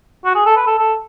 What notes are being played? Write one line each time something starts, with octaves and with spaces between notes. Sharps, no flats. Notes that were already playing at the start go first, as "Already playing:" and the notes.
F#4
G#4
A4
B4
A4
A4